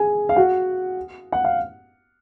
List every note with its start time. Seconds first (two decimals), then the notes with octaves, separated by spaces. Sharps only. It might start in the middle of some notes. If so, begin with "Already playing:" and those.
Already playing: G#4 G#5
0.29 F5
0.36 F#4 F#5
1.32 F#5
1.44 F5